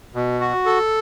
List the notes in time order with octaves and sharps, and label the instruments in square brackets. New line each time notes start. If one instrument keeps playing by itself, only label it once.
[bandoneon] B2
F#4
A4